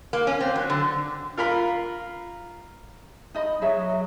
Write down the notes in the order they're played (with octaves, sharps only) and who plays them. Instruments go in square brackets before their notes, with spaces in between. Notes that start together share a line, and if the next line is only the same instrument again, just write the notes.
[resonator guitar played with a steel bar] A#3
C#4
C4
F#3
D3
[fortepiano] F4 A#4 F5 B5
[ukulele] D#4 D#5 B5
[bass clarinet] F#3 [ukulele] G#4 C#5 E5